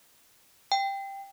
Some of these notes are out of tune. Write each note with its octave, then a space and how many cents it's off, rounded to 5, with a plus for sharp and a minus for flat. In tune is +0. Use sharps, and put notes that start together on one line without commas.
G5 +5